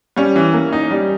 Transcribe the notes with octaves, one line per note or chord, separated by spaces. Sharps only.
G3 C#4
E3
A#3
D#4
G3